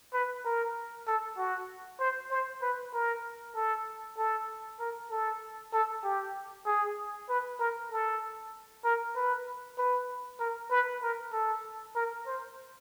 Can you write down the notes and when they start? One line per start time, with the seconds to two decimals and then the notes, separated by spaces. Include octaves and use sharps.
0.14 B4
0.45 A#4
1.07 A4
1.38 F#4
2.00 C5
2.31 C5
2.62 B4
2.94 A#4
3.55 A4
4.18 A4
4.80 A#4
5.11 A4
5.73 A4
6.04 G4
6.66 G#4
7.29 B4
7.60 A#4
7.92 A4
8.85 A#4
9.16 B4
9.78 B4
10.40 A#4
10.71 B4
11.02 A#4
11.33 A4
11.95 A#4
12.27 C5